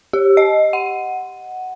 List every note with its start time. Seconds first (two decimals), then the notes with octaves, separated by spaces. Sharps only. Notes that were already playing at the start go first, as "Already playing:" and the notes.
0.13 G4
0.37 D#5
0.73 F#5